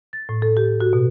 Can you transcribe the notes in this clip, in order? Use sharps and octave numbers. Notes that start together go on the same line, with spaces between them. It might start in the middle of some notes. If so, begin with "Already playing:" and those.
A6
A2
A4
G4
F#4
B2